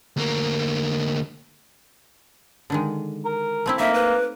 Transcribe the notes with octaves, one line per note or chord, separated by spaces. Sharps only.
D2 A#3
D3 D#3 G#3
A#4
A3 C4 E4
A#3 D#4 E5
B4